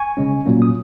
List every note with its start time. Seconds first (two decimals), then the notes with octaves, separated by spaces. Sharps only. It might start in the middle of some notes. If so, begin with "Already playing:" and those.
Already playing: G#5 C#6
0.17 C#3 G#3 C#4
0.46 A#2 F#3 A#3 C#4
0.62 D#6